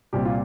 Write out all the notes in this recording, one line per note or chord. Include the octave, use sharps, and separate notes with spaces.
C2 A#2 G3 C4 G4
F4